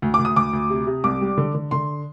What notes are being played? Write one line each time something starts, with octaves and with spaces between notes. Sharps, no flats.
D2
D6
D2
D#6
D2 D6
D2
C3
C3
C2 D6
G3
D3
D3
D3 C6